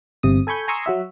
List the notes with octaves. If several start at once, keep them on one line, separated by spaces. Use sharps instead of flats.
G1 C3 D#6
A4 G#5 B5 C#6 G6
G#5 A#5 C6 C#6 D#6 E6
F#3 F#4 E5